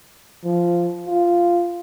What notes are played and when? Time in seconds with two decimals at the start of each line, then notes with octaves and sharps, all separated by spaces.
0.44 F3
1.07 F4